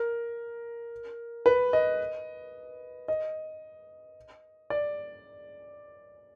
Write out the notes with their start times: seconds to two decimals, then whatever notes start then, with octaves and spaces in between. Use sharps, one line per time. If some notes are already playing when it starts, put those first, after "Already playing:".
Already playing: A#4
1.46 B4
1.73 D#5
3.08 D#5
4.70 D5